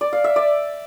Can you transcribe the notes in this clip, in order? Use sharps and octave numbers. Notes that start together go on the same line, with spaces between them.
D5
F5
E5
D5